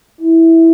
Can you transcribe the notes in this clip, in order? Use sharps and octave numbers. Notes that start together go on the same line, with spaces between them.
E4